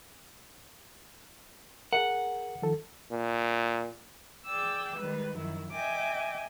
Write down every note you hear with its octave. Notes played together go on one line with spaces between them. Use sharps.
G#4 A#4 F#5
D#3 F3 A4
A#2
G#4 D5 G5 D6 E6
D#3 G3 G#3 B4
F#2 D#3 F3 E4
D#5 E5 G5 G#5 D6